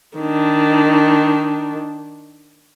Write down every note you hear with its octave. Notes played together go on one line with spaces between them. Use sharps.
D#3 D4